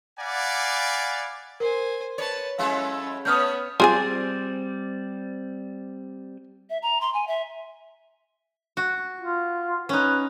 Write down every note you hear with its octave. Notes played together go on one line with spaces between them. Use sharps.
D5 F5 F#5 G#5 B5 D6
A#4 C5 G#5
B4 C#5 A5
F#3 G#3 C#4 E4 A4 F5
A3 B3 C#4 C#5 D#6 F6 G6
G3 C4 F4 G#4 D5 G#5
E5
A#5
C6
G#5
E5
F#4
F4
C#4 D#4 B4